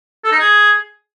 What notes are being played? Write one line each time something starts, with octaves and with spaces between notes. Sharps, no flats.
A4
D#4
G#4